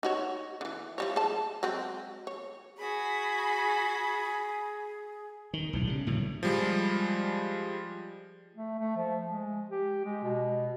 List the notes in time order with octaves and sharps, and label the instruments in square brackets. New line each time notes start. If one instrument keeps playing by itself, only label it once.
[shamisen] D#4 F#4 C#5
D3 E3
F3 G3 C#5
G#4 A5
F#3 G#3 C4
C#5
[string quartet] F#4 B5 [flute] G#4
[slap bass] D#3
B1 A2 E3
C#3 G3
A2 D3 E3 F#3
[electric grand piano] F3 G3 G#3
[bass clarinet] A3
A3
F3
G#3
G4
G#3
B2